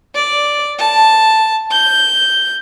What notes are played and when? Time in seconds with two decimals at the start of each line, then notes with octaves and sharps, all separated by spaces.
0.15 D5
0.79 A5
1.71 G6